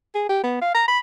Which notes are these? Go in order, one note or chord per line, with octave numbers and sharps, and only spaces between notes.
G#4
G4
B3
F5
A#5
B5